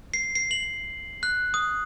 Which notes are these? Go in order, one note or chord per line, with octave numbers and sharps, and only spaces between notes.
C7
C7
F#7
F#6
D#6